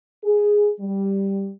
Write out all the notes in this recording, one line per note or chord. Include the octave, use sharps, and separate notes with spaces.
G#4
G3